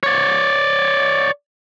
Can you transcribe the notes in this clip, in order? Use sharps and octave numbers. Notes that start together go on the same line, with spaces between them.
C#5 D5